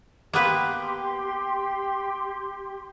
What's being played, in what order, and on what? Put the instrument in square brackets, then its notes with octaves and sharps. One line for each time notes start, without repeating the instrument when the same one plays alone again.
[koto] A#3 B3 B4 [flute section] G4 C6